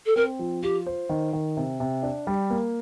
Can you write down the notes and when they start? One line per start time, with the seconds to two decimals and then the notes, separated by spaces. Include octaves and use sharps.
0.06 A4
0.16 C4 A#4
0.39 F3
0.63 F4 G4
0.86 C5
1.09 D#3
1.33 D#3
1.57 C3
1.80 C3
2.03 D4
2.27 G3
2.50 A#3